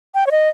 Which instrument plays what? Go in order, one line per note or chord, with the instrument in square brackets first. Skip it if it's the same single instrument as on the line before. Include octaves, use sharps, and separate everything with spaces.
[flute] G5
C#5
D#5